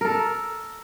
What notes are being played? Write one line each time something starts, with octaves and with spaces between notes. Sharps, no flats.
A4 A#4